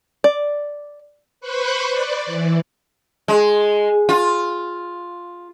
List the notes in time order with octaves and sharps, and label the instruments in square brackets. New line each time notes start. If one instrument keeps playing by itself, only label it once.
[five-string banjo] D5
[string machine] B4 C5 B5 C#6 F#6
D5
E3
[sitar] G#3
F4